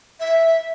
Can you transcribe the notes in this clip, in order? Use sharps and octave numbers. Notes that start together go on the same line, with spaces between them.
E5